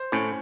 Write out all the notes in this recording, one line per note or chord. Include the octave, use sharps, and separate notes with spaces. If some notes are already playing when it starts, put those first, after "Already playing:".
Already playing: C5
A2 C#4